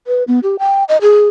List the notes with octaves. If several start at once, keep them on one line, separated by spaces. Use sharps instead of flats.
B4
B3
G4
G5
D#5
G#4